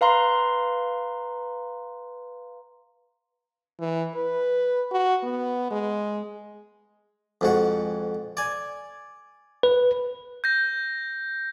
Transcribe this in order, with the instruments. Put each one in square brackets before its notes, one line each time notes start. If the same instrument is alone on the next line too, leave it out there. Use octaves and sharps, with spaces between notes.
[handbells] B4 F5 A#5 C6
[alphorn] E3
B4
F#4
B3
G#3
[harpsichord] F2 G#2 F#4
D5 G#5
[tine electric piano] B4
[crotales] G6 A#6